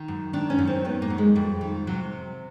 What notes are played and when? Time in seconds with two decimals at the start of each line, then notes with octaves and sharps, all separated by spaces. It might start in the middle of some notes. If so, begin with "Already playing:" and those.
Already playing: D#3
0.08 F#2
0.33 D#3 D4
0.50 C#4
0.59 F#2
0.67 C4
0.85 D#3 B3
1.02 A#3
1.10 F#2
1.18 G#3
1.36 F2 G3
1.61 D#3
1.87 C3 F#3